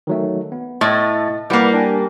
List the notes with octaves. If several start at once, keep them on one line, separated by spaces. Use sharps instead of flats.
D#3 F#3 A3
B3
A2 D#5 A6
G3 A#3 E4 B4 F#5
D4 G5 G#5